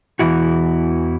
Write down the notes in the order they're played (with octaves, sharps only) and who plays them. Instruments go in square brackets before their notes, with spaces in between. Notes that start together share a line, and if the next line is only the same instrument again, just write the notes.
[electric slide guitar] E2 A#2 E3 E4 F#4